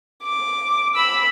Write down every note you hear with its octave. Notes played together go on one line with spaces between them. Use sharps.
D6
B5 E6